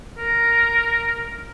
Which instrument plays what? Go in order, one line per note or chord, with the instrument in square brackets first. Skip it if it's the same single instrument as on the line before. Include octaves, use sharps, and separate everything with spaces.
[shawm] A#4